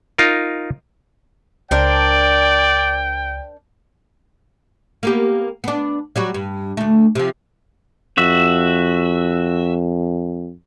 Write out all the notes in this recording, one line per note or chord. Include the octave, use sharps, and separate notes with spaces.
D#4 F4 A#4
C#2 D4 A#4 C5 D5 G5
A#3 B3 G4
B3 D4
F#3 G3 F#4
G2
D2 A3
C3 F3
F2 F#4 E5